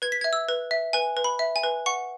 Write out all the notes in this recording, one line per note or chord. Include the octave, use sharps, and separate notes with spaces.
B4 G#6
B6
E5 G#6
E6
B4
E5
B4 G#5
B4
B5
E5
G#5
B4
F#5 C#6